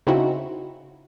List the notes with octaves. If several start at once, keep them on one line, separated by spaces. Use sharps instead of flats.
C#3 C4 D#4 E4 F#4